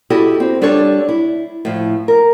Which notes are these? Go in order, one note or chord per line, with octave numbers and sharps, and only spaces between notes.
E4 F#4 G4 A4 D#5
C4
G3 D4 F4 A4 C#5
E4
A2 F3
A#4